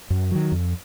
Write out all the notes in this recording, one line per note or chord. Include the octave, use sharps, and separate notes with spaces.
F#2
D#3 F#3
F2